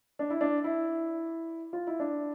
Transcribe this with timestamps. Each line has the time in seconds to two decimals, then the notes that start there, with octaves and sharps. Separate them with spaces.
0.19 D4
0.30 E4
0.41 D4
0.64 E4
1.73 F4
1.87 E4
2.00 D4